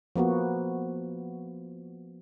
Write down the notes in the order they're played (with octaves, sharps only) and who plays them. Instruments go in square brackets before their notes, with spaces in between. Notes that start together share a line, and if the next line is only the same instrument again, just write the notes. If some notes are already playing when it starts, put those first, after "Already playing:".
[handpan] F3 A#3 B3 F#4